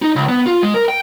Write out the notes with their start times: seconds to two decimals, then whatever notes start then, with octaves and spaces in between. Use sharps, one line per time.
0.02 D#4
0.16 C#2
0.29 B3
0.46 F4
0.63 G#3
0.74 A#4
0.88 G5